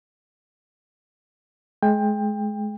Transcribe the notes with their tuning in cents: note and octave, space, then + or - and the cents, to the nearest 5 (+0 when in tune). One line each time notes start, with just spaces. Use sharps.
G#3 +30 G5 +25